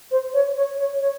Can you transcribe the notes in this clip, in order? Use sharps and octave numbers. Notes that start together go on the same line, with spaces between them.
C5
C#5
C#5
C#5
C#5